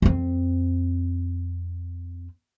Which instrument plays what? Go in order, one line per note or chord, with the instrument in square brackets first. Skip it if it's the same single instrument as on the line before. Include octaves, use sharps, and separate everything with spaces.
[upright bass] F2 C4